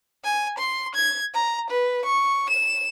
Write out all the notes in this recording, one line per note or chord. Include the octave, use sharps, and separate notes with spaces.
G#5
C6
G#6
A#5
B4
C#6
E7